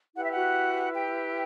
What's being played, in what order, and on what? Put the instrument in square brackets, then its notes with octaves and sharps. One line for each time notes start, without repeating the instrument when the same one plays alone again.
[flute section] E4 G4 B4 F#5
E5
F#4 F#5
G4 G5